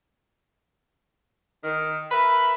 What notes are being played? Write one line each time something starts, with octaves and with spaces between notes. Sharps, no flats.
D#3
A#4 B4 E5 B5